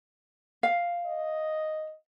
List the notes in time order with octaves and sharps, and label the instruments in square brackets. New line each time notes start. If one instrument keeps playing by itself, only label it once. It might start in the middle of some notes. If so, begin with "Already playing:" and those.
[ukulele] F5
[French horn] D#5